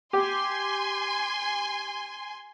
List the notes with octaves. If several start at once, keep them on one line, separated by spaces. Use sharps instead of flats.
G4 G#5 C6